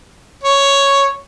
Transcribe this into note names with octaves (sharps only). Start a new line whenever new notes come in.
C#5